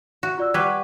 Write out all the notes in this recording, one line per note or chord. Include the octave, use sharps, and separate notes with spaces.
F#4
F4 D5 E6
G3 B4 F#5 C#6 G#6